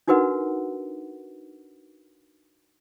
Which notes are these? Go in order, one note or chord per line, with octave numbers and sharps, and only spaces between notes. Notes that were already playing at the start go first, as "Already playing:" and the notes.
D4 D#4 F#4 A#4 B4 F#5